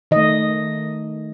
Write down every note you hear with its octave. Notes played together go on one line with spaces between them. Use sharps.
D#3 A3 D#5